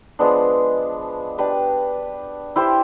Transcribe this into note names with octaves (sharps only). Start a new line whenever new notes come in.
F3 G#3 B3 D4
D4 G4 B4
E4 G4 C5